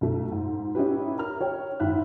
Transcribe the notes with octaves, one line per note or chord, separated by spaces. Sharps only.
B1 A3
G#2
C#4 D#4 E4 G4 B4
A#4 A#5 F6
C#5 G5
G#2 D#3 E4 E5 F#6